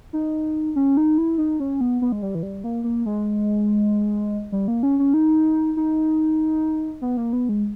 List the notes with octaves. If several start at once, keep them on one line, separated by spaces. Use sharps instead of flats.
D#4
C#4
D#4
E4
D#4
C#4
B3
B3
G#3
G3
E3
G3
A#3
A#3
G#3
G3
A#3
C#4
C#4
D#4
D#4
B3
A#3
B3
G#3